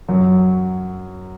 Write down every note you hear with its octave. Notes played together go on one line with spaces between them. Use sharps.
F#2 F#3